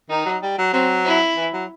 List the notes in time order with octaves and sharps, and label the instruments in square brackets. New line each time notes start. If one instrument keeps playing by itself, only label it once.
[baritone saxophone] D#3 [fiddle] D#4
[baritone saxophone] F#3
G3
F#3
[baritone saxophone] F#3 [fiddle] C4
[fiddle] E4
[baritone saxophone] E3
F#3